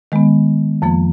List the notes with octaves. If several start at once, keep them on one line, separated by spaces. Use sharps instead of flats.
D#3 G#3 B3
F2 F3 A#3